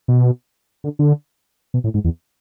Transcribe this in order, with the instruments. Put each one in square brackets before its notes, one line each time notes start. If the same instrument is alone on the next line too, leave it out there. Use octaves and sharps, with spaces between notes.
[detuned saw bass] B2
D3
D3
B2
A2
G#2
E2